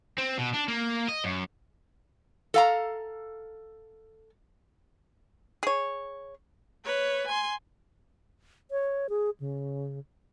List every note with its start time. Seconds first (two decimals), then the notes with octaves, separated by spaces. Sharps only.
0.18 C4
0.38 B2
0.54 D4
0.68 A#3
1.09 D#5
1.24 F#2
2.54 A4 F5 A#5
5.63 G#4 C#5
6.85 B4 C#5
7.28 G#5 C6
8.71 C#5
9.09 G#4
9.40 C#3